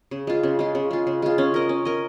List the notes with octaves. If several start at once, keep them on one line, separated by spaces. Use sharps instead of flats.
C#3
G#3 F4
C#3
G#3 F4
C#3
G#3 F4
C#3
G#3 F4
C#4
A#4 D#5
C#4
A#4 D#5